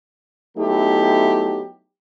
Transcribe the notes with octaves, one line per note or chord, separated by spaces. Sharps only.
F#3 A3 B3 D#4 E4 G4